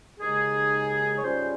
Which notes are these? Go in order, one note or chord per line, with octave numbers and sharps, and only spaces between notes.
D#2 C#3 G#3 D#4 G#4
C#5
G#2 G3 C#4 F4 C5